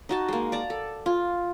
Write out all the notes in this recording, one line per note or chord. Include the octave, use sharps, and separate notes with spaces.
D#4 F#4 A5
G#3 A#3
D5 A5 A#5
A4
F4